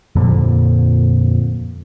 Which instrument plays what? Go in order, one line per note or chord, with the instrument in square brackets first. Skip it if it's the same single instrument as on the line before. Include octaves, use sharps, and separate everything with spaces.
[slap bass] F2 A#2 D3 F3